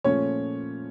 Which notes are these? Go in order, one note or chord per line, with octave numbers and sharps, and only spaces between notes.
A#2 F3 A3 C#4 C#5